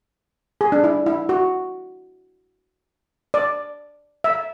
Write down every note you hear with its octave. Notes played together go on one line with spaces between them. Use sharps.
G#4
D4
E4
E4
F#4
D5
E5